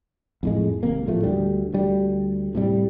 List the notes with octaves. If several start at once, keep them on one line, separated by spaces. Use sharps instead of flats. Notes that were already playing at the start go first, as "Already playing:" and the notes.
F2 A2 G#3
G#1 C3 A#3
A2 F3 A3
D2 G3
D2 G3
A2 C3 G3